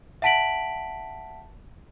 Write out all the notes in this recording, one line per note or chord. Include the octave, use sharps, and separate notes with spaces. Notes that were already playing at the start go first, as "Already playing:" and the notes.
E5 F#5 A5 B6 D7 F#7